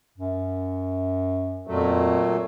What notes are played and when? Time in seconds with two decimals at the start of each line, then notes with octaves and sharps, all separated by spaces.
0.18 F#2
1.67 F2 A#2 F#3 A3